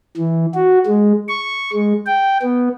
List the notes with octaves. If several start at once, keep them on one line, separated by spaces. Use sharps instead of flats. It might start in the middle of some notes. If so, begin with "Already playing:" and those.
E3
F#4
G#3
C#6
G#3
G5
B3